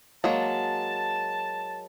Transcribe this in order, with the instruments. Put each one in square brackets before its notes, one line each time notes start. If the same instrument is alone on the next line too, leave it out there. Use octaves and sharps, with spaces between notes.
[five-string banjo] F#3 G#3 A#3 [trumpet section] A5